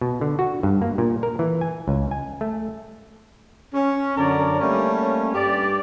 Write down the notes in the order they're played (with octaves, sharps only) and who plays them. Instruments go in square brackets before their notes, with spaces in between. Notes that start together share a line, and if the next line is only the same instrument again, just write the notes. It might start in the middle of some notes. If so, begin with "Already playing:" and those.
[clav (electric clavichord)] B2
D3
F#4
G2
A#3
A#2
A#4
E3
G#5
C#2
G#5
A3
[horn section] C#4
F#2 D3 D4 A#4 C#5 D5
G3 A3 A#3 C#4
G2 G4 D5